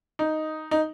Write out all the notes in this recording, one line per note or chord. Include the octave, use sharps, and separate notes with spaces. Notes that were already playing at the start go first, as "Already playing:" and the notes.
D#4
D#4